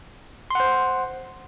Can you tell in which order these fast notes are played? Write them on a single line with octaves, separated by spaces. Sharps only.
C6 F#5 C5